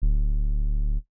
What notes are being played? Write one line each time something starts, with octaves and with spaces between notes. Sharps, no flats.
D1